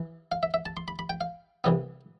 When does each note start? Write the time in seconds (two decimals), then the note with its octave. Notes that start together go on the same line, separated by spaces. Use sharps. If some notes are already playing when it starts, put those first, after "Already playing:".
Already playing: E3
0.32 F5
0.43 E5
0.54 E5
0.66 A5
0.77 C6
0.88 B5
0.99 B5
1.10 G5
1.21 F5
1.64 C2 C3 E3 B3